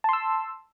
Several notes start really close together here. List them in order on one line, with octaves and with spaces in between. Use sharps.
A5 C6 E6